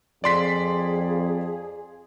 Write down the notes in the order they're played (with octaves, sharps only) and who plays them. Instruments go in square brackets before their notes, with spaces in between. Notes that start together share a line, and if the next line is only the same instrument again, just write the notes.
[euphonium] F2 [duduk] G#4 [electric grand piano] D5 C6 B6